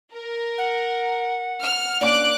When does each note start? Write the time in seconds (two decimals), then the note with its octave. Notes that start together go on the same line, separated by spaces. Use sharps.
0.12 A#4
0.58 F#5
1.62 F6
2.01 A#3 C#4 D4 D6 F#6